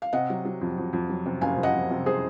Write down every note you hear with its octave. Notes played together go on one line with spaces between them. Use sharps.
F5
C3 D#5 F#5
F#3
F#3
F2
F2
F2
F#3
C3
F#1 F5 G#5
F#1
D#5 F#5
F2
C3
C3 G#4 C5